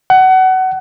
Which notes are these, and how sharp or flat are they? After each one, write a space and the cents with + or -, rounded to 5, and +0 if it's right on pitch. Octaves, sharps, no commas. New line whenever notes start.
F#5 +25